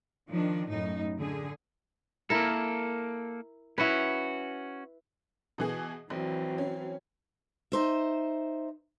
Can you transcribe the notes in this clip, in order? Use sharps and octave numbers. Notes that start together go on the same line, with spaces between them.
D#3 F3 D4
F#2 A2 D#4
D3 G#4
A#3 E4 A4 A#4
C#4 E4 F#4 B4
B2 E3 G#4
A#1 E3 F#3 C4
C#4
D#4 C5 E5